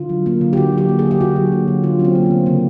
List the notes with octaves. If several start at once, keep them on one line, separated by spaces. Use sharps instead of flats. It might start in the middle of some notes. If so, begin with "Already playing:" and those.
Already playing: D3 F4
F#3
A#3
D3
G4
D3 F#4
F#3
G4
A#3
G#4
D3
G4
D3 F#4
F#3
A#3
D3
D3 F4
F#3 C#4
C4
A#3
B3
D3
C#3 A#3